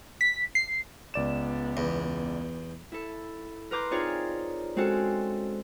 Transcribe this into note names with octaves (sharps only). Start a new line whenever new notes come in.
B6
C7
C#2 B3 D5 E7
E2
E4 A4
A#4 B4 A#5 C6 D6 G6
C4 D#4 F4 G#4 C#5 D5
G#3 C4 C#4 F#4 A4